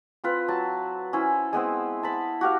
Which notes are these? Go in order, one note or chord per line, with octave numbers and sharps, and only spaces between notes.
C4 F4 B4
F#3 A5
C#4 E4 C5
G#3 B3 C4 C5
A5 B5
F#4 G4 F5